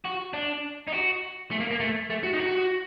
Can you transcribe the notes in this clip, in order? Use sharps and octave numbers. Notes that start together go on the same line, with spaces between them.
F#4
D4
D#4
F#4
A3
A#3
A#3
A3
A3
F#4
D#4
F#4